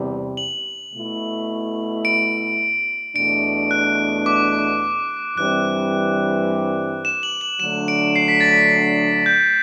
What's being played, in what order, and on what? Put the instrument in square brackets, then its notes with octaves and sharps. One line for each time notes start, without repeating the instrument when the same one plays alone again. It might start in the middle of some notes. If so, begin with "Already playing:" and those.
Already playing: [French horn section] E2 C3 G3
[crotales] F#7
[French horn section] B2 A3 E4
[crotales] D7
[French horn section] E2 B2 A3 D4 [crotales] D7
[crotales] F#6
D6
[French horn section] G2 E3 G3 C4 [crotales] F#6
[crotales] E7
F#7
F#7
[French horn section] D3 F#3 A3 D4 [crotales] E7
[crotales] D7
C7
B6
A6
B6
G6